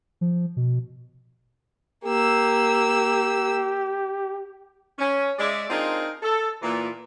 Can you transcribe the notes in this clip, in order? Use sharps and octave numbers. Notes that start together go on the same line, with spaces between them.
F3
B2
A#3 G4 E6
C#4
G#3 D5 E5
C4 D4 D#4 F4 G#4 A#4
A4
A#2 E3